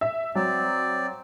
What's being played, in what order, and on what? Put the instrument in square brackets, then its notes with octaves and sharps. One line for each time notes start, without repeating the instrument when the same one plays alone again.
[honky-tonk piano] E5
[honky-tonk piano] F#3 [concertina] C4 D5